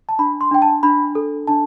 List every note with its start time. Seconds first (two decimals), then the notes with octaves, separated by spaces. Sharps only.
0.09 A5
0.19 D4 B5
0.41 C6
0.51 D4 G5
0.62 A5
0.83 D4 B5
1.15 A4
1.47 D4 A5